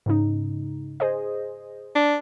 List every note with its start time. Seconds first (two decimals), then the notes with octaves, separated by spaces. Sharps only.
0.06 G#2 C#3 D#4
1.00 G#4 C5 D#5
1.96 D4